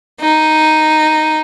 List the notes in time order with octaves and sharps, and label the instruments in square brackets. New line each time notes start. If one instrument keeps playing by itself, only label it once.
[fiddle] D#4